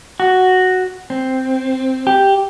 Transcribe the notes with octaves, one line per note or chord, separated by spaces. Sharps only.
F#4
C4
G4